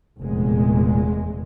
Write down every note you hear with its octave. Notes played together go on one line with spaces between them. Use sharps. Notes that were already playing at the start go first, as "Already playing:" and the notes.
F1 E2 A#2 G#3